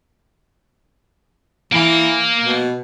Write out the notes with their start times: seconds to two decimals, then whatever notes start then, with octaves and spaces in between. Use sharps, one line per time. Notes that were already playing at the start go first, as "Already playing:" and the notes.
1.73 E3 A#3 F5
2.43 B2